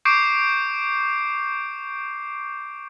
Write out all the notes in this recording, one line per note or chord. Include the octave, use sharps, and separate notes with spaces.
C#6 D6 G6 C7 D7